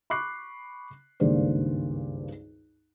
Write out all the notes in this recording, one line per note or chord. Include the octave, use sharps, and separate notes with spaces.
B5 C#6 D6 F#6 C7
G#1 C#2 G2 A#3 C5 D5